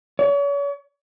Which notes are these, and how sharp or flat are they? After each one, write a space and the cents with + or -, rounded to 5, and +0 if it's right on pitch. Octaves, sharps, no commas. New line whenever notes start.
C#5 +40